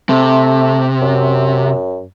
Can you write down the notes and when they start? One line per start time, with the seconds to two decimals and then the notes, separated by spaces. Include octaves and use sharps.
0.09 C3 A3
1.01 F#2